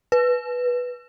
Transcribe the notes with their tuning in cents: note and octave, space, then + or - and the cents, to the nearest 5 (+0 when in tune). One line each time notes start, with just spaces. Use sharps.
B4 -5